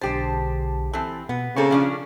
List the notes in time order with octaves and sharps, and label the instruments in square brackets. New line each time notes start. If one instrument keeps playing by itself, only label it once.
[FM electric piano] B1 D3 A5 [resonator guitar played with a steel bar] G#3 G4 C5
[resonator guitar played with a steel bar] E3 C4 [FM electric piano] A4 A5
[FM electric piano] B2 [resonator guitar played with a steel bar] B3
[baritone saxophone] C#3 [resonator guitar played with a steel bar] A#3 C4 A4 [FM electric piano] C#6
[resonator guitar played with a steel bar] F3 C#4 D4